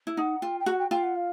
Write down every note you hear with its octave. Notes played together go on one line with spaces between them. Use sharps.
E4
D#4 F#5
F4 G5
G5
F#4 F#5
G5
F4 G5
F#5
F5